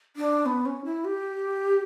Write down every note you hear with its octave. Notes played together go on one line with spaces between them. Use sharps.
D4
B3
C#4
E4
G4